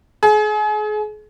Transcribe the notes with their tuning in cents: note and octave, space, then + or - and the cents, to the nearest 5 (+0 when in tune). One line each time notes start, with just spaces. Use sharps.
G#4 +35